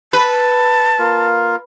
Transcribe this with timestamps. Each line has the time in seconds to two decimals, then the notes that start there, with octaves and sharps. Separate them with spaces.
0.13 B4 A5
0.99 A#3 F4 A#4